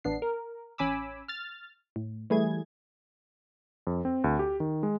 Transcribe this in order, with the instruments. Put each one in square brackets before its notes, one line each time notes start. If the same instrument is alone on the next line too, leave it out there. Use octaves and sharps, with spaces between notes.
[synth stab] A1 B3 D4 C7
A#4
A1 C#4 G#5 B5 D6 E6
F6 A6
A2
E3 G3 A3 E4 G#4 G#6
[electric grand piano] F2
C4
D2
G4
D#3
G#3